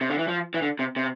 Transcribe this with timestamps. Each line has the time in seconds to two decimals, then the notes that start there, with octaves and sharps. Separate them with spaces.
0.01 C3
0.10 D3
0.19 E3
0.28 F3
0.54 E3
0.62 D3
0.79 C3
0.96 C3